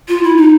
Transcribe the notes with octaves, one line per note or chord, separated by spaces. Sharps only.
F4
E4
D#4